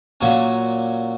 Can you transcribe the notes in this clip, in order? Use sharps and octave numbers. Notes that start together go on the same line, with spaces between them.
A#2 F#3 C#4